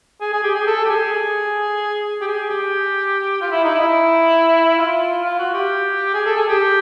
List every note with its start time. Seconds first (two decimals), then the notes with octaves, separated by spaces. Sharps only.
0.21 G#4
0.33 G#4
0.44 G4
0.55 G#4
0.67 A4
0.85 G4
0.90 G#4
1.12 G#4
2.21 G4
2.27 G#4
2.50 G4
3.41 F4
3.51 E4
3.64 D#4
3.75 E4
4.78 F4
5.24 F4
5.39 F#4
5.54 G4
6.14 G#4
6.26 A4
6.37 G#4
6.49 G4